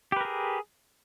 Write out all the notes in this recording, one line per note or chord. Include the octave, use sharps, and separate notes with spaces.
G4 G#4 A#4 B4